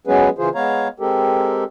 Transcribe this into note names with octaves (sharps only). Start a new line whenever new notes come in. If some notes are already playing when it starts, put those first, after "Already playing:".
F#3 G#3 B3 C#4 G#4 B4
C#3 E3 F4 G#4 C5
G#3 B3 C#5 F5 A#5
G#3 C4 G4 A4 A#4